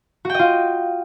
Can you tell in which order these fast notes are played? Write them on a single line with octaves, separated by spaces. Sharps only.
F#4 G5 D#5 F4